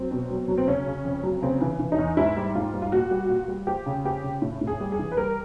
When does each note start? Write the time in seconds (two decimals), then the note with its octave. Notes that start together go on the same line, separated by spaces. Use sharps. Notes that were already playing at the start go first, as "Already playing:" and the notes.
Already playing: F#3 C4
0.11 B2
0.30 F#3
0.48 F#3
0.58 C4
0.68 C#3 C#4
0.86 C#3
1.05 F2
1.23 F#3
1.42 C#3 C4
1.61 E3
1.79 E3
1.92 D#4
1.98 E2
2.17 G#2 E4
2.37 G3
2.55 G#2 F4
2.74 G3
2.82 F4
2.92 A#2 F#4
3.11 G3
3.29 A#2
3.48 G3
3.67 F3 G4
3.86 C#3
4.04 F3 G4
4.23 C#3
4.42 A2
4.61 A2
4.67 G#4
4.80 G3
4.92 G#4
4.99 E3
5.12 B4
5.17 G3 A#4